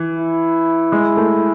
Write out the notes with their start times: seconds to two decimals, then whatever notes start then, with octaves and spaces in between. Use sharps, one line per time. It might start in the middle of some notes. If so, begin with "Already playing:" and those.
Already playing: E3
0.15 E4
0.92 G#3
1.17 A3